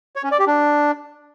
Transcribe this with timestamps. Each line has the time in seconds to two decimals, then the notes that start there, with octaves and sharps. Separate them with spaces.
0.16 C#5
0.23 C#4
0.31 D5
0.39 G4
0.47 D4